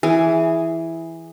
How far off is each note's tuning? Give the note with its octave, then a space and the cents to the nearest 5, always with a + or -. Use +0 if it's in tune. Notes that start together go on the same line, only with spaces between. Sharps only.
E3 +0 G#4 +5